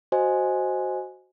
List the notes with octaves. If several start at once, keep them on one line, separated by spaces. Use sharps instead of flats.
F#4 C5 D#5 G#5